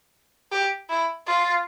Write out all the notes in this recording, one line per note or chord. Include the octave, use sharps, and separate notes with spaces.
G4
E4
F4